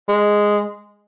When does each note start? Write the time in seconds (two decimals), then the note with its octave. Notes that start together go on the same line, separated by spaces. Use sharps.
0.09 G#3